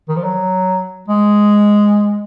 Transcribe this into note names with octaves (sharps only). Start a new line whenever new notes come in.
D#3
F3
F#3
G#3